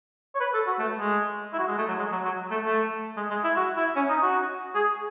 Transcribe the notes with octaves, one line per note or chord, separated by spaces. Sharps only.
C#5
B4
A4
F#4
A3
G#3
E4
F#4
G#3
A3
F#3
G#3
F#3
F#3
A3
A3
G#3
G#3
E4
F#4
E4
C#4
D#4
F#4
G#4